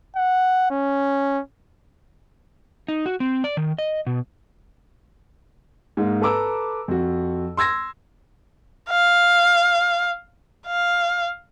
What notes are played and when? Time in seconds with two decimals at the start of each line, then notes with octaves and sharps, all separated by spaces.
0.16 F#5
0.70 C#4
2.88 D#4
3.06 F#4
3.20 C4
3.44 D5
3.57 D#3
3.78 D#5
4.07 B2
5.97 G#2 G#3 A#3
6.22 A4 B4 A#5 D6 E6
6.88 F2 F#4
7.57 C6 E6 G#6 A#6
8.90 F5
10.67 F5